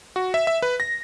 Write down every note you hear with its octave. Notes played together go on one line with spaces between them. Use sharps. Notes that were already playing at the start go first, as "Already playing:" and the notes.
F#4
E5
E5
B4
A#6